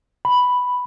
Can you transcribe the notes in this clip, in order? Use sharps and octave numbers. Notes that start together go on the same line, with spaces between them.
B5